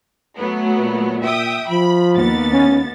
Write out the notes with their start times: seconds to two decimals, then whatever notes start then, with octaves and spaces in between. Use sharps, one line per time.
0.37 F#3 A3 B3
0.79 A#2
1.22 E5 G5 D#6
1.70 F3 B5
2.16 D#2 B3 A6
2.53 C#4